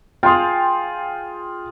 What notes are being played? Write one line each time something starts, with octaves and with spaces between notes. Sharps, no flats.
F4 G#4 G5 C6